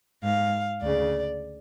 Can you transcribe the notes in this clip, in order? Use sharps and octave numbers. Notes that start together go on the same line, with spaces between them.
G#2 F5
D2 C#3 D5